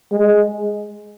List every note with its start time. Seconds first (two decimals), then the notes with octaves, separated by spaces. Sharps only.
0.12 G#3